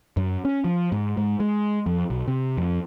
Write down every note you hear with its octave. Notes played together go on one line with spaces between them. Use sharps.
F#2
C#4
F3
G#2
G#2
G#3
F2
B1
C3
F2